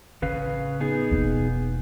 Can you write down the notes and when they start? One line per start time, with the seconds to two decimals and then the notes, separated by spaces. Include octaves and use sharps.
0.22 A1 C#3 B4 F5
0.80 B3 D#4 G#4
1.11 E1 A#3